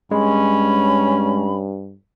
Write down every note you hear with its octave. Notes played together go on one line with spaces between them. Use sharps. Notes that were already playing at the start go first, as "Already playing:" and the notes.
G2 G#3 C#4 B5